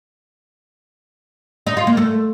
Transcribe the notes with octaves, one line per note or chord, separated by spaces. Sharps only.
D#4
F4
A#3
A3